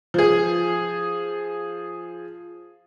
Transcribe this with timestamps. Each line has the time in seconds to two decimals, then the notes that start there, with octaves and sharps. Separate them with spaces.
0.14 F3 G#4